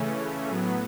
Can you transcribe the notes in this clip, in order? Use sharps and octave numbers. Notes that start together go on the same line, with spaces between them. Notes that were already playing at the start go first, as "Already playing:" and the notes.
Already playing: C#3 E3 A3 C#4
A2 F#3 B3